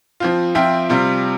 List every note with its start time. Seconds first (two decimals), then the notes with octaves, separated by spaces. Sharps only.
0.20 F3 C4 F4
0.55 F3 C4 F4 E5 G5
0.89 C3 G3 C4 F4